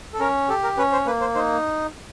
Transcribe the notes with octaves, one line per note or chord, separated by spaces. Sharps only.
A4
C#4 A#4
G4 A4
A#4
C#4 B4
C5
A#3 B4
C5
D#4 C5